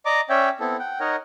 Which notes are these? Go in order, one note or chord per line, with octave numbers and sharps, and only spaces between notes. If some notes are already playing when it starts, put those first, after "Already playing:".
D5 D#5 A#5 D6
C#4 C#5 D5 E5 G5
B3 C4 E4 A4
F#5 G5
D#4 A#4 C#5 D#5 F#5